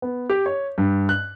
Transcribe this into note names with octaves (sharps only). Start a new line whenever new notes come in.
B3
G4
C#5
G2
F#6